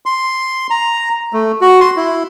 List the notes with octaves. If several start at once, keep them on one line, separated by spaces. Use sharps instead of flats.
C6
A#5
A3
F#4
C6
E4